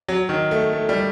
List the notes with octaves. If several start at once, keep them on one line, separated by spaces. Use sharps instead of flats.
F#3
D#3
A3
A3
G3